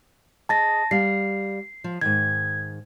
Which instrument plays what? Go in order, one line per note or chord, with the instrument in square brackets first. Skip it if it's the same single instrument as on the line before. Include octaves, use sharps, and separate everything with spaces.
[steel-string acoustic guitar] G#4 D#5 [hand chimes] A5 A6 A#6
[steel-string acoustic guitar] G3 F5 [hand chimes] C7
[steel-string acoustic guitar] F3
[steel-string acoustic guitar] G#2 D#3 [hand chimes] G#6